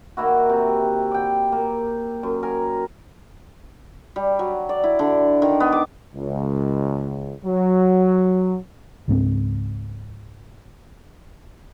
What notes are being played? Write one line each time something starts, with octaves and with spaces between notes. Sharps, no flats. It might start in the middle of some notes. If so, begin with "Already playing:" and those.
D#3 A#3 E4 F#4
C3
D5 G5
A#3
F#2
A#4 G#5
G3
F#3
D5
E4
D3
D#3
B3
D6
C#2
F#3
C#2 G#2 A3 C4